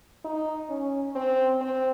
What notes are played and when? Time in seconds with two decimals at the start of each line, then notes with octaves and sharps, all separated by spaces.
0.25 D#4
0.69 C#4
1.15 C4
1.61 C4